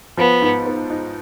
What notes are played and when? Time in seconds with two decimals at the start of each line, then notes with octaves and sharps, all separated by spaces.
0.17 F3 B3
0.42 G#2
0.67 B3
0.90 D#4